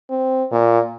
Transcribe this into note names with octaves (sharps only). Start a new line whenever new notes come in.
C4
A#2